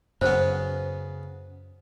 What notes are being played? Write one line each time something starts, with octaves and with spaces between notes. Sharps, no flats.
F#2 C#3 B3 C5